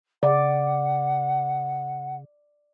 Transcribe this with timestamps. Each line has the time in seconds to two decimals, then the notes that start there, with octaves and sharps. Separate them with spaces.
0.23 C#3 D5 F#5